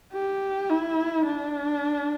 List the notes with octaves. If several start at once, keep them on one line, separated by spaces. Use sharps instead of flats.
G4
E4
D4